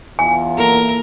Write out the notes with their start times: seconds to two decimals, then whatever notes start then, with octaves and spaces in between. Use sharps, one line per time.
0.19 E2 F4 G#5
0.58 A#3 E4 A4 A#4